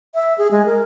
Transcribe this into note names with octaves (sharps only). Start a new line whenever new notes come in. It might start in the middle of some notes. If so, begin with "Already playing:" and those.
E5
G#4
G#3
A#4